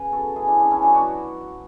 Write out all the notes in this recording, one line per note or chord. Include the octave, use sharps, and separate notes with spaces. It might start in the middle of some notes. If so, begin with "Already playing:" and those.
Already playing: C#3 B4
B3 F#4 A4
C#3 E4 G#4
D4 F#4
B3 D4
C#4 E4
F#3 D4 F#4
D4 F#4